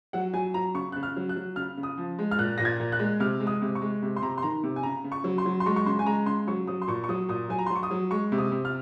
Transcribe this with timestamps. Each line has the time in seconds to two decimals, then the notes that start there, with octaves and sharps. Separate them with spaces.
0.13 F#3 F#5
0.33 F#3 G#5
0.54 F#3 A#5
0.74 C#3 C#6
0.92 C#3 F#6
1.03 F6
1.16 F#3
1.29 F#6
1.36 F#3
1.56 C#3 F6
1.77 C#3
1.83 D#6
1.97 F3
2.19 G#3
2.31 F6
2.39 A#2 F#6
2.58 A#2 A#6
2.65 G#6
2.80 A#2
2.92 F#6
2.99 G#3
3.20 C3 F6
3.40 G#3
3.47 D#6
3.62 C3
3.75 C#6
3.82 G#3
4.02 C3
4.16 C6
4.22 C3 A#5
4.38 C6
4.43 D#3 A#5
4.63 C3
4.76 G#5
4.83 C#3 A#5
5.04 C#3
5.12 C#6
5.24 F#3
5.38 C6
5.46 F#3
5.60 C6
5.66 G#3 C#6
5.76 C#6
5.86 C#3 C6
5.99 G#5
6.06 G#3 A#5
6.26 C#3 C6
6.48 F#3 C#6
6.67 F#3 D#6
6.82 C6
6.88 A#2 C#6
7.04 C#6
7.09 F#3 D#6
7.29 A#2 D#6
7.49 F#3 G#5
7.59 A#5
7.66 C6
7.70 F#3
7.75 C#6
7.83 D#6
7.91 F#3
8.11 G#3 C#6
8.32 C3
8.38 D#6
8.52 C3
8.65 F6